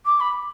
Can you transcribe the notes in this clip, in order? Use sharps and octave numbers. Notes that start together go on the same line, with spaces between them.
D6
B5